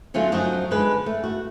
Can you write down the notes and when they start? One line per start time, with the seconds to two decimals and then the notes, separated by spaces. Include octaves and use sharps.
0.14 D3 F#3 A3 C#4 F4 F#4
0.32 F#2 F3 D#4 F#4
0.71 D3 G#3 B4
1.06 A3
1.24 F#4